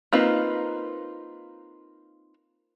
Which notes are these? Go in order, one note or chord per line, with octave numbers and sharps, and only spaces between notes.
A#3 C4 D#4 F4 B4